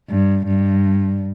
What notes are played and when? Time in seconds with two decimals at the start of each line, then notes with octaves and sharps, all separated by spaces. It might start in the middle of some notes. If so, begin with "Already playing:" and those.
0.10 G2
0.46 G2